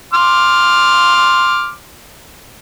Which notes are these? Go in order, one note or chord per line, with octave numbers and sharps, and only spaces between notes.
C6 D6 F6